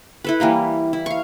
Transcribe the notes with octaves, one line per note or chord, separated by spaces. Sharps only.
E4 A4 B4
E3 G3 A#3 A#4
E4
F5 C#6